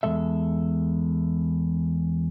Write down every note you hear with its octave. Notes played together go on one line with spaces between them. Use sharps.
E2 D#3 G#3 A4 E5